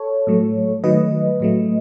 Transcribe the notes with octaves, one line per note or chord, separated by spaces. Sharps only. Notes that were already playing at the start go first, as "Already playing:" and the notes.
Already playing: A4 C#5
A2 F#3 A3
D#3 F#3 A3 B4 D#5
A2 F#3 A3